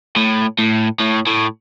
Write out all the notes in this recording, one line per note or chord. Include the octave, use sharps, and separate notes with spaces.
A2
A2
A2
A2